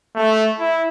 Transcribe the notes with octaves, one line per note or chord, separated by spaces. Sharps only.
A3
E4